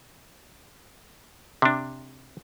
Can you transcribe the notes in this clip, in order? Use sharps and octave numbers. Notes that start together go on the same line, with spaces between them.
C3 D4